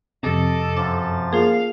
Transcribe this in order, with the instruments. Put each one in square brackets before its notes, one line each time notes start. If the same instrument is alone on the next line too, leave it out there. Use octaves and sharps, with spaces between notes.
[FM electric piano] F2 C3 [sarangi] A4 [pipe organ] D#5 A5 D6
[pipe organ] F#2 F3 A6 [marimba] D6
[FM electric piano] A#3 [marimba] F4 G#4 [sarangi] F5